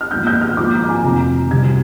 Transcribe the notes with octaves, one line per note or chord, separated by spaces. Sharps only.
F6
A#1 G#2 D#3 G6
G6
F6
A#1 G#2 F3 D6
A#5
A#5
G#5
F1 F2 D#3 A#5
C2 C3 G3 C4 G#6